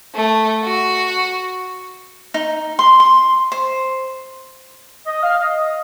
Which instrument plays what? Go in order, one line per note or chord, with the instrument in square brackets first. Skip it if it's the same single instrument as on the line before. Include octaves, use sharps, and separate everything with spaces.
[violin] A3
F#4
[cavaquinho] D#4
C6
C6
C5
[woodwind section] D#5
F5
D#5